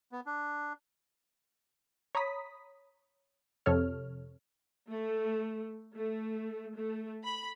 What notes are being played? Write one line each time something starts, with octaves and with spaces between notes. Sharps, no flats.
B3
D4
C#5 A#5 B5 D#6 B6
F2 C3 A4 C#5 F6
A3
A3
A3
B5